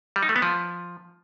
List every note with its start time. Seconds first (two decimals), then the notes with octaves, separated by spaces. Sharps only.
0.16 G3
0.23 D#4
0.29 A3
0.36 B3
0.42 F3